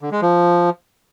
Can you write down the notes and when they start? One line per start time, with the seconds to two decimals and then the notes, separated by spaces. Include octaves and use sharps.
0.01 D3
0.11 G#3
0.22 F3